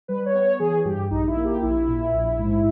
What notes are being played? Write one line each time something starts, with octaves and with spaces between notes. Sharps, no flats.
G3 B4
C#5
B3
C#5
E3 G#4
G2 G4
A#1 D#4
E4
A#3
G4
A#1 E4
A#2
A#1
G#2